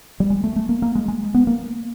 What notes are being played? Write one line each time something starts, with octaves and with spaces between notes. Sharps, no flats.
G3
G#3
A3
A3
A#3
A#3
G#3
G#3
B3
A#3